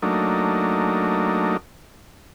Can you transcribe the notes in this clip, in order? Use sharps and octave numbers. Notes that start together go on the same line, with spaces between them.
F#3 A3 A#3 D4 D#4